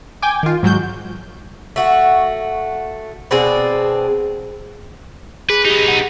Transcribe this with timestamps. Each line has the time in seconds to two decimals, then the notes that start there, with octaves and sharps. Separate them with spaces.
0.22 G5 G#5 D6
0.43 D#3 F4
0.63 G#2 F#3 F#4 G6
1.76 A3 F#4
3.31 B2 C4 D4 G#4
5.50 G#4 B4
5.65 B3 D#4 G4
5.88 F#5